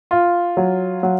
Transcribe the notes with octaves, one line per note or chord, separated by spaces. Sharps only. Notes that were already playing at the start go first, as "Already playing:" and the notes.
F4
F#3
F#3